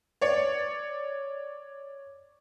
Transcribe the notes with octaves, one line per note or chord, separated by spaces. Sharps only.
C#5 D5 C#7